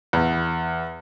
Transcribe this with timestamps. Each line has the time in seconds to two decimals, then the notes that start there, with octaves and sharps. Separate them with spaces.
0.13 E2